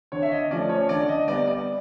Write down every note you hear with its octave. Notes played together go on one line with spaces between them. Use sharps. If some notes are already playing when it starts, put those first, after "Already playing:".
D3 C#5
E5
D#5
F3 A3 C#4 D5
C#5
D3 D5
D#5
G3 B3 D5
D5